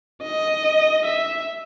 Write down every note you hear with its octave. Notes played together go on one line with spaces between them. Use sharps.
D#5
E5